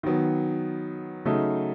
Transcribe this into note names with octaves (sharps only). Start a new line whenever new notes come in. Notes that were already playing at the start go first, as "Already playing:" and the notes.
D#3 F#3 B3
C#3 F#3 A3 D#4